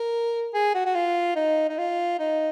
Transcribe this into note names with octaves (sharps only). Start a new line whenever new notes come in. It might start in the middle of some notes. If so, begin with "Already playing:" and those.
Already playing: A#4
G#4
F#4
F#4
F4
D#4
D#4
F4
D#4